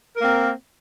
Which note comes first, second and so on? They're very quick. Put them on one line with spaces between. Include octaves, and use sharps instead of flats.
A#4 A#3 C4